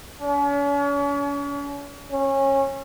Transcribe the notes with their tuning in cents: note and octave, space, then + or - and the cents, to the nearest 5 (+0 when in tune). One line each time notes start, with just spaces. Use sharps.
C#4 +40
C#4 -25